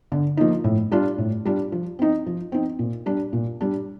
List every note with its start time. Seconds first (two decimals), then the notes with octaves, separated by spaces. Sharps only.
0.12 D3
0.37 F3 A#3 D#4
0.64 A2
0.92 G3 D4 F4
1.18 A2
1.45 G3 D4 F4
1.72 F3
1.99 C4 D#4
2.26 F3
2.52 C4 D#4
2.79 A#2
3.06 G3 D4
3.33 A#2
3.61 G3 D4